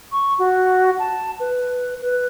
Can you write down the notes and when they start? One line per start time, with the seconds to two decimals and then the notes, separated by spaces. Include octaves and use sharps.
0.12 C#6
0.39 F#4
0.99 A5
1.40 B4
2.02 B4